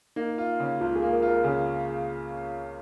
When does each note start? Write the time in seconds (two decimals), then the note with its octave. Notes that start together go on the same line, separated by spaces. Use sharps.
0.16 A#3 D#4
0.38 F4
0.60 C#3
0.81 C#2 F4
0.96 G#4
1.02 A#3
1.13 A#4
1.22 F4
1.28 A#4
1.44 C#3 G#4